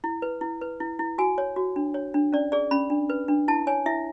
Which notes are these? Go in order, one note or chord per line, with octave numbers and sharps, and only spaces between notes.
E4
B4
E4
B4
E4
E4
F#4 G#5
C#5
F#4
D4
C#5
D4
C#4 D5
G#4 D5
C#4 B5
D4
B4
D4
E4 A5
C#5 G#5
E4 E5